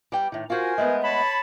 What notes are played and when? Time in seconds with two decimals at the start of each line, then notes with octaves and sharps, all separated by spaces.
0.12 G3 G5
0.32 A2 D#3
0.50 F4 F#4 A#4 C5 G#5
0.78 G#3 A3 B3
1.02 C#5 A5 B5